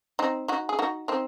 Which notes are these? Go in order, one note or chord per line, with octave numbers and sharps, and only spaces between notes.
C4 D#4
D#4 F#4
G#4
D#4 F#4
C4 D#4